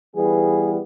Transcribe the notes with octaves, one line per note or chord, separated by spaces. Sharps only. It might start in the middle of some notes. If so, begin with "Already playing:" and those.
E3 G3 B3 G#4